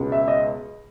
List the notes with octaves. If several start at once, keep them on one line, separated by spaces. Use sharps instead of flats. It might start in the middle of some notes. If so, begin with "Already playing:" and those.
Already playing: C#2 B2 G#3
E5
D#5